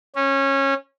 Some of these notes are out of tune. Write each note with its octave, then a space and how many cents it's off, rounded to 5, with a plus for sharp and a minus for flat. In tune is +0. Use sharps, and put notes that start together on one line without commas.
C#4 -20